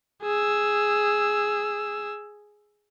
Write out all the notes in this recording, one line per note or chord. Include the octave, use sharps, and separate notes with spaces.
G#4 E6